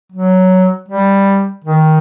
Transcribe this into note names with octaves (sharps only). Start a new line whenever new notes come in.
F#3
G3
D#3